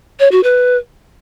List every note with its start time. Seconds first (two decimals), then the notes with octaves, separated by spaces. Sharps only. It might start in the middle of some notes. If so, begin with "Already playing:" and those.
0.20 C#5
0.32 F#4
0.44 B4